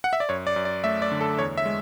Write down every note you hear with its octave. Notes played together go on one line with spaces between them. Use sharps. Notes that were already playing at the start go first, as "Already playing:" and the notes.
F#5
E5
D5
F#2 C#5
D5
F#2
D5
A3 E5
D5
D3
A4
E2 C#5
E5
G#3